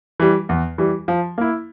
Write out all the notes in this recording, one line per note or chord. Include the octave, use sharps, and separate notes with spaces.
E3 G3
E2
E3 G3
F3
A#3 E4